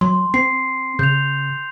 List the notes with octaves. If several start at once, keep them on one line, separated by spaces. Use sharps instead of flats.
F#3 C6
C4 C7
C#3 G6 F7